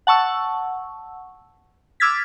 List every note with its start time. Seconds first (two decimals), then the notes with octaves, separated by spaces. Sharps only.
0.07 F#5 A5 C#6 E6
2.00 D6 E6 F6 G#6 A6 B6